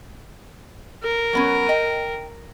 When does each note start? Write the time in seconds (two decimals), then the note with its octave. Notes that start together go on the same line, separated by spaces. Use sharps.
1.04 A#4
1.33 F#3 B3 C#4
1.69 D#5 G5